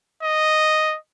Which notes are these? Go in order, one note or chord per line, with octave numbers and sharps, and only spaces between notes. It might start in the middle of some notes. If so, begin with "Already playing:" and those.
D#5